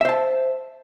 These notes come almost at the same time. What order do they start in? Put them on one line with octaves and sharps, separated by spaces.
E5 C5 A5